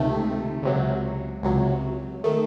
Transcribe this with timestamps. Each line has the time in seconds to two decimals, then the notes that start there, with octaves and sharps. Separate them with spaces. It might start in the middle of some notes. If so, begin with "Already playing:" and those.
Already playing: C#2 C3 D#3 A3
0.63 C#2 C3 F#3
1.43 C#2 C3 F#3
2.24 D#3 A3